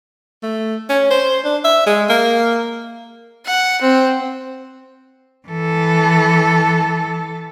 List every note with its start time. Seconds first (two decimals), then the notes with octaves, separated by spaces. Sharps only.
0.43 A3
0.89 C#4
1.10 C5
1.44 D4
1.64 E5
1.87 G#3
2.09 A#3
3.46 F#5
3.81 C4
5.48 E3 A4